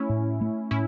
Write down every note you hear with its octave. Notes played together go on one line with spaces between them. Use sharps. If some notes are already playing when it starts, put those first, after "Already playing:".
Already playing: A3 C#4 E4
A2
A3
A2 C#4 E4